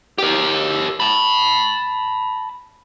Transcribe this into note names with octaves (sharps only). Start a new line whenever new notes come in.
G4 A#4
A5 B5